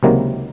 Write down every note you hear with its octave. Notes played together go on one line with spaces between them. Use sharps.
C#2 C3 D#3 F#3 A#3